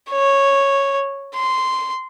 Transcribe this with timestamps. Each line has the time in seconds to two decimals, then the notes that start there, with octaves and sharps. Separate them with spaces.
0.11 C#5
1.35 C6